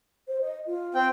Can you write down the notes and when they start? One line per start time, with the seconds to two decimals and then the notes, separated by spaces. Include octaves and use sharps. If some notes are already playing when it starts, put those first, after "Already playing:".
0.28 C5
0.41 D#5
0.67 F4
0.95 C4 G5